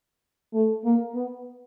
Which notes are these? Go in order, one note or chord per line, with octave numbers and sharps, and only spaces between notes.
A3
A#3
B3